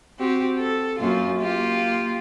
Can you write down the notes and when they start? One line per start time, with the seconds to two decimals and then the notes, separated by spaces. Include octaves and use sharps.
0.19 C4 F#4 G4
0.58 A4
0.99 F#2 A#3 F4
1.40 A#3 F4 G4